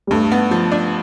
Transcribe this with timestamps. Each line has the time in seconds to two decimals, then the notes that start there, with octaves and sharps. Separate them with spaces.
0.07 G3
0.11 G2 A3
0.32 B3
0.51 F3
0.72 D4